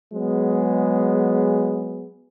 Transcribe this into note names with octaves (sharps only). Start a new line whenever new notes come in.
F#3 G#3 B3 G#4